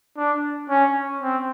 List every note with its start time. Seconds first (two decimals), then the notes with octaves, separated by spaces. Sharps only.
0.17 D4
0.69 C#4
1.22 C4